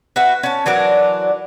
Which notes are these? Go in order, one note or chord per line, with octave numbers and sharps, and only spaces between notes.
F#4 B4 E5
C#4 A5
E3 F#3 D4 A#4